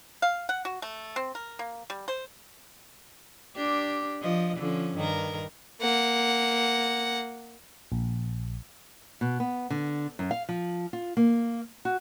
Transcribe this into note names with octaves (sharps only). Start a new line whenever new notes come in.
F5
F#5
F#4
A3
C4
A#4
A#3
G3
C5
D4 G4
F3 D#5
D3 F3 C#4
G2 D#3 A#4
A#3 F#5
A#1
B2
B3
D3
F#2
F5
F3
F4
A#3
F#4